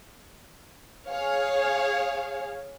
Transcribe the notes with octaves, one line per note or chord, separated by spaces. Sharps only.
G#4 C#5 F5